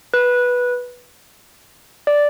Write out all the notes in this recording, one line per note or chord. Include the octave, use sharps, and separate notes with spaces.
B4
D5